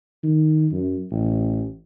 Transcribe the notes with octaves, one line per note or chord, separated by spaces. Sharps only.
D#3
F#2
A1